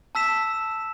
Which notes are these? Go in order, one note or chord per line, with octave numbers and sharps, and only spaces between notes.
A5 E6 B6 E7